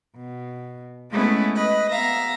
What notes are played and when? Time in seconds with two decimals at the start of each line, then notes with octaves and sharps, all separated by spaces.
0.16 B2
1.11 G#3 A3 B3 C#4 E4
1.55 B4 D#5
1.91 B3 E5 F5 A#5 A#6